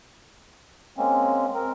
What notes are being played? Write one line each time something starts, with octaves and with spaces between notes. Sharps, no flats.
G#3 A#3 C4 C#4
C4 A#4